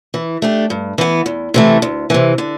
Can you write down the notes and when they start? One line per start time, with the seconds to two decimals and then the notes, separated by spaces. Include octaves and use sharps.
0.14 E3
0.42 A3 D4 G4
0.70 G2
0.98 E3 B3
1.26 E2
1.54 C3 E3 A3
1.82 D2
2.10 C3 E3
2.38 D3